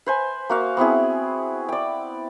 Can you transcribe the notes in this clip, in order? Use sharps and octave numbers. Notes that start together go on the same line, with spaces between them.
B4 C5 G#5
A#3 F#4 F5
B3 C4 E4 G#4
D5 G5